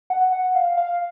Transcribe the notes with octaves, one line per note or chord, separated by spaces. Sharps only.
F#5
F#5
F5
F5